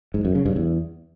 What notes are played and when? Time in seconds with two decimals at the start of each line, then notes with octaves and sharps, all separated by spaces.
0.14 G#2
0.25 F#2
0.35 C#3
0.46 G2
0.56 E2